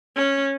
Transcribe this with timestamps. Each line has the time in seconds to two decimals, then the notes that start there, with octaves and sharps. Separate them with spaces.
0.16 C#4